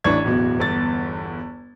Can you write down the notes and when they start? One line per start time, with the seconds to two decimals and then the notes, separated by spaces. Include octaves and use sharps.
0.04 A1 E3 D4 C#6 G#6
0.24 D1 E2 B2
0.59 G1 E2 A6